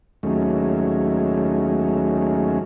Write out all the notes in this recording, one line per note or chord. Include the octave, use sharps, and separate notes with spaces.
D#2 F#3 G#3 A3 C#4